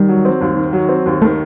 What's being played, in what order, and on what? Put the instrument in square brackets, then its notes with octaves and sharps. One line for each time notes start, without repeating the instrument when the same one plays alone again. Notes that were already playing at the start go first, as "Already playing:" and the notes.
Already playing: [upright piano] D#3 [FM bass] G3
[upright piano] F#3
C4
D#2
D#3
F#3
C4
D#2
[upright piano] D#3 [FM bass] A3